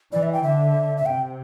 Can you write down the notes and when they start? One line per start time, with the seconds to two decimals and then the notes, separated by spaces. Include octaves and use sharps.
0.12 E3 D5
0.23 E5
0.33 G5
0.43 D3 E5
0.97 E5
1.06 C3 G5